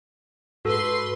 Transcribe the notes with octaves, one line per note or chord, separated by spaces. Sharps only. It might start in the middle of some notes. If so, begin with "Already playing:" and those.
G#2 F#4 A4 B4 C6